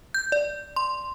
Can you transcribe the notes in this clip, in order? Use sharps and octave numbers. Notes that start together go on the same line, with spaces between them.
G6
D5
C6